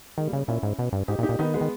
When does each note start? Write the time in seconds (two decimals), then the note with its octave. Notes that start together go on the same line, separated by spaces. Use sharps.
0.18 D#3 G#3
0.27 G3 A#3
0.33 C#3
0.48 A#2 C#4 E4
0.63 G#2
0.79 B2
0.93 G2
1.08 G#2 D#4 G4
1.19 A#2
1.23 D#4 G4
1.29 A#2
1.39 D#3 B3 D#4
1.54 G#3 B3
1.61 D#3